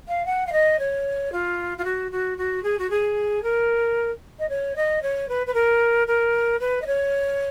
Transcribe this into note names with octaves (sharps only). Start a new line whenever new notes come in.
F5
F#5
F5
D#5
C#5
F4
F4
F#4
F#4
F#4
G#4
F#4
G#4
A#4
D#5
C#5
D#5
C#5
B4
B4
A#4
A#4
B4
D#5
C#5